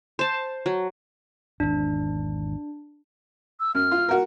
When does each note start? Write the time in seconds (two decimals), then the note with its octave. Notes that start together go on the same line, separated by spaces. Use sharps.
0.19 C5 A5
0.66 F#3
1.60 G#1 E2 D4
3.60 E6
3.75 F#2 F6
3.91 F4
4.09 F#4 A#4